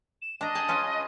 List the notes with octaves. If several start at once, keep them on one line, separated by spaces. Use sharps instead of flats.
E7
D4 D#5 A#5
G#4 G5 A5
C#4 F4 B4